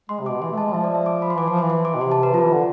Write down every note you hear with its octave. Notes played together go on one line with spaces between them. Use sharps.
G#3 C6
C3
B2 D6
E3 C6
A3
G#3 A5
F3 E5
D5
E5
D6
B5
C6
E3 D6
F3 C6
C6
E3
C6
D6
B2
C3 C6
A5
B4
F3 F4
E3
D3